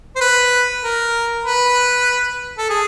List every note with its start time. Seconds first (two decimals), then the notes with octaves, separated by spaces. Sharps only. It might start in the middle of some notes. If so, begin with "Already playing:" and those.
0.15 C5
0.21 B4
0.83 A#4
1.45 B4
2.58 A4
2.69 G#4